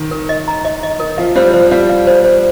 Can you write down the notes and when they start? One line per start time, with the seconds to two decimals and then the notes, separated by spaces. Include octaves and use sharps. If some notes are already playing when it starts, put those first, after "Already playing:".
Already playing: D#3
0.11 A#4
0.29 D#5
0.48 A#5
0.65 D#5
0.83 D#5
1.00 A#4
1.18 F3 F5
1.36 G3 C5
1.53 F3 C5
1.71 G3 F5
1.89 F5
2.07 C5
2.24 C5